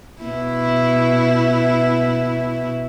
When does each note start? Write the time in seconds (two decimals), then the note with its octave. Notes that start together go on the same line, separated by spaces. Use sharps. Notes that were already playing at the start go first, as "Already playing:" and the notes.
0.22 B2 E4